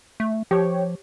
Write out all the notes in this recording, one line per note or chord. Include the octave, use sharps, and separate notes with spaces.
A3
F3 G4 C#5